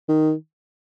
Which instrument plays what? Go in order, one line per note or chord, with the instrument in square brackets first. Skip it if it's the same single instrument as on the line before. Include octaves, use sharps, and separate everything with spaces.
[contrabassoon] D#3